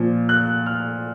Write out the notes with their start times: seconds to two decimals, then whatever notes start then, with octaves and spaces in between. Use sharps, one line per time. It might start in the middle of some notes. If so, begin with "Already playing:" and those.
Already playing: A#2 F3
0.29 F#6
0.66 F6